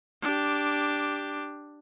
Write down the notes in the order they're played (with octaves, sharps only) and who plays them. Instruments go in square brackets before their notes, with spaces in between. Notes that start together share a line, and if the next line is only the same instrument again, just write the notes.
[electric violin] D4 G4